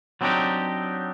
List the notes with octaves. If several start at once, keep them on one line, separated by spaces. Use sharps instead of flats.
F#3 B3 C4 D4 D#4 G4